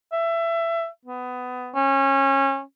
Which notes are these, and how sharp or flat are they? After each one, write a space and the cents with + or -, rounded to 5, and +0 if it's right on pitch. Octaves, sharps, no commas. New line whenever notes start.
E5 +20
B3 +20
C#4 -25